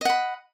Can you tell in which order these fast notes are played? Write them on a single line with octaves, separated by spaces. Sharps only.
D#5 F#5 B5